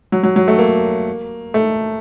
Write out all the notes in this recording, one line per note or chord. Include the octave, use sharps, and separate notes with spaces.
F#3
F#3
F#3
A3
A#3
A3